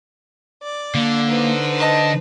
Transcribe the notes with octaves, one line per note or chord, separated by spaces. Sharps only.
D5
D3 A#3
D#4 B4 C5
D#5 A5